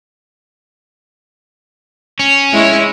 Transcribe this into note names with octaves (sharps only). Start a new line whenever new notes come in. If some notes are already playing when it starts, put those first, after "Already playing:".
C#4
G#3 E4 C#5